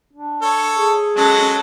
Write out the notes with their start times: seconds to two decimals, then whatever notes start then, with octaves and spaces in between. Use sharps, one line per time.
0.13 D4
0.42 A4 C#5
0.75 G#4
1.17 F#3 G#3 C#4 A4 F#5